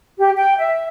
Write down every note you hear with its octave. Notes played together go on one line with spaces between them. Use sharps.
G4
G5
E5